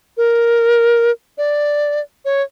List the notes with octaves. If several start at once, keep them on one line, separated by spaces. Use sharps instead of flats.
A#4
D5
C#5